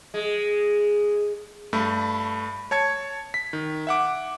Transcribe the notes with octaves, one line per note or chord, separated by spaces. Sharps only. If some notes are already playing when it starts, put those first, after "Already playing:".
G#3
G2 A3 B5
C#5 A5 G#6 C#7
B6
D#3
E5 F#5 D6